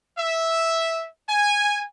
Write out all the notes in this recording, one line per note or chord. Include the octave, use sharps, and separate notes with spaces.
E5
G#5